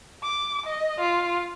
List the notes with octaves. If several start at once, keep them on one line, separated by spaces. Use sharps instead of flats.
D6
D#5
F4